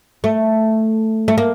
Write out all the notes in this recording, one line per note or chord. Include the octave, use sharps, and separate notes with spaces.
A3
A3
A#3